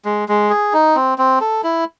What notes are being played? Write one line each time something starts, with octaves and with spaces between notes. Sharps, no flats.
G#3
G#3
G#4
D#4
C4
C4
A4
E4